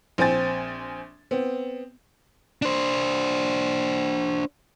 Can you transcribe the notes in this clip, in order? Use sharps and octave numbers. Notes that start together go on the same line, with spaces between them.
A#1 C4 C5 G#5 A6
B3 C4
D4 C5